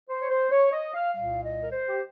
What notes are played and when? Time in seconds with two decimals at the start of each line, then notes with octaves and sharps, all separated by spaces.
0.09 C5
0.21 C#5
0.31 C5
0.51 C#5
0.72 D#5
0.94 F5
1.15 C2 A#2 G3 F5
1.44 D#5
1.62 A#4
1.72 C5
1.88 G4